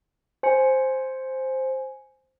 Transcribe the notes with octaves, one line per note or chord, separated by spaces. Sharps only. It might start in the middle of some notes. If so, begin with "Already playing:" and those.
C5 G#5 C#7